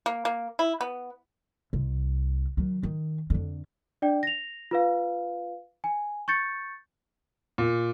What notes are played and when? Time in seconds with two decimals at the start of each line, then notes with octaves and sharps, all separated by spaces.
0.06 A#3
0.25 A#3
0.59 E4
0.81 B3
1.73 C2
2.57 D#3 F#3
2.83 D#3
3.30 F2 D3
4.02 D4 D5 G5
4.23 A#6 F7
4.71 F4 B4 F5
5.84 G#5
6.28 C#6 G6 A6 C#7
7.58 A#2